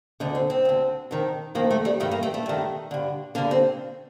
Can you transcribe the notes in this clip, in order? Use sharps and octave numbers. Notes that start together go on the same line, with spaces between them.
D2 D3 D#4
C4
C4
D2 D3
F2 D#3
F2 D#3 A#3
A3
G3
G2 D#3 A3
A#3
A3
A3
G2 D#3
G2 D3
G2 D3 A#3
C4